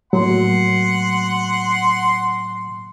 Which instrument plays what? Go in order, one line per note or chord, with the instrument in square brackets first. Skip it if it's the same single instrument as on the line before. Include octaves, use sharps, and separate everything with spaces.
[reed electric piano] A2 F#3 A#3 [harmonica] F#5 C6